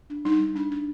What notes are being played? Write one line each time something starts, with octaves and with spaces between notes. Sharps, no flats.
D4
G3 D#4
G3
D4
D4